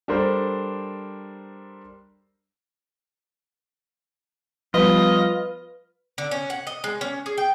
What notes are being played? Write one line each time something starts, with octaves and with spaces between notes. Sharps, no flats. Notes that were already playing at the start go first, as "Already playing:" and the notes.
G3 D4 A4 A#4 C5
F3 G3 B3 F4 B4 D#5
D3
C#4
F#5
D#5
G#3
C#4
G#4
G5